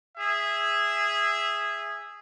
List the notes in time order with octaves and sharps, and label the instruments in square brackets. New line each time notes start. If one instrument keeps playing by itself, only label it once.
[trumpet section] G#4 E5